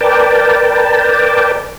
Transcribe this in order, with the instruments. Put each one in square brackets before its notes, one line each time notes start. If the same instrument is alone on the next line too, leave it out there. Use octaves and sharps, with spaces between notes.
[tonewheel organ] A#4 B4 D5 G5 A5